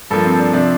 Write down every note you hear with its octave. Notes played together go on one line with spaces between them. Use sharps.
G2 F3 A#3 A4
C4
D4
C3 F3 C4 D4